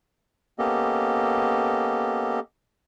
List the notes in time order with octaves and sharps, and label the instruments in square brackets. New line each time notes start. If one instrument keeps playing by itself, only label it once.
[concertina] A#3 B3 C#4 G4 A4 D#5